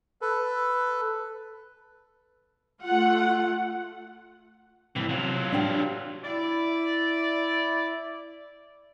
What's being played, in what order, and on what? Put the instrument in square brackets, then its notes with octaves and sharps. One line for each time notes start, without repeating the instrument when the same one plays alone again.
[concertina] A4 B4
[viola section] A3 F4 F#5
[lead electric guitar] A2 E3 [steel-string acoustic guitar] C3
[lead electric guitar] F#3 F4
[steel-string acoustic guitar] D4 G4
[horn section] E4 D5